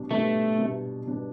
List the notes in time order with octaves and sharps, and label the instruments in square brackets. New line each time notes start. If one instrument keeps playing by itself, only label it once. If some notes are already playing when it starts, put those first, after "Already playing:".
Already playing: [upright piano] B2 G3 D4
[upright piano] B2 G3 D4 [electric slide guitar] A3
[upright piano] B2 G3 D4
B2 G3 D4